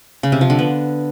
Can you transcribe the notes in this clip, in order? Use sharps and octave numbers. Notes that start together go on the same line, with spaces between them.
C#3
C3
F3
D3
B3